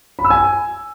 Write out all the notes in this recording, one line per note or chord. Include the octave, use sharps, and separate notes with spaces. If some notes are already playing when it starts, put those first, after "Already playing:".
B5
E6
G#5